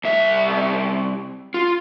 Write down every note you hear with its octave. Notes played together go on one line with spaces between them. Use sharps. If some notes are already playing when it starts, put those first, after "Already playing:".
C2 E5
F4